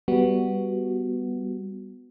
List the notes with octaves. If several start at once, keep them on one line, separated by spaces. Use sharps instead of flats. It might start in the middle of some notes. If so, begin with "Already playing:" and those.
G3 B3 F#4